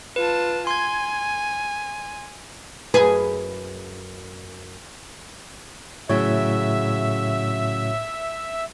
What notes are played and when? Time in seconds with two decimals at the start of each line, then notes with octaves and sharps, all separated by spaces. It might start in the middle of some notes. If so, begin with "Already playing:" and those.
0.16 F4 B4 A5
0.67 G#5 C6 G#6
2.94 F#2 G#4 B4
6.09 A2 C#3 F#3 C#5 E5